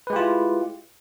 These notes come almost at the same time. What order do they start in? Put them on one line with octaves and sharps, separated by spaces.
B4 G#3 G4 F4 E4